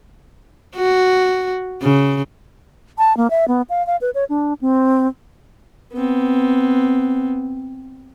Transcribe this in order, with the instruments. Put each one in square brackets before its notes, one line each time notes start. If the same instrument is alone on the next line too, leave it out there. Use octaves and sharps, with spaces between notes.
[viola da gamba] F#4
C#3
[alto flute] A5
A#3
E5
B3
F5
F5
B4
C#5
D4
C4
[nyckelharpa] B3 C4